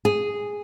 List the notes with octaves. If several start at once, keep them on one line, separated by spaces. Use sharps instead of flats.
G#4